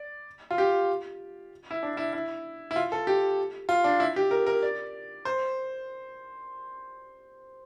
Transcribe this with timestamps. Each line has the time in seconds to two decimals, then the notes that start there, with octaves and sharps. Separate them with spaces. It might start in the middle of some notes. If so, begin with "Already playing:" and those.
Already playing: D5
0.51 F4
0.58 G4
1.71 E4
1.83 D4
1.97 E4
2.13 E4
2.71 E4
2.76 F4
2.92 A4
3.07 G4
3.69 F4
3.84 D4
4.00 E4
4.16 G4
4.31 A#4
4.47 A#4
4.63 D5
5.25 C5